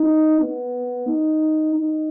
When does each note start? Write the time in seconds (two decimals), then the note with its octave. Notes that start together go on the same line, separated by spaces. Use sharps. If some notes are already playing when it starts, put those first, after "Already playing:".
Already playing: D#4
0.41 B3
1.08 D#4
1.75 D#4